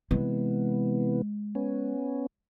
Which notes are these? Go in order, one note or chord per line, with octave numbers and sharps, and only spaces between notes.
C3 E3 G#3 B3
B3 C#4